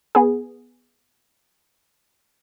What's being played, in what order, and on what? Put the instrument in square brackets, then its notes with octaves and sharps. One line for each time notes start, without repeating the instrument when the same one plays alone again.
[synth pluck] B3 G#4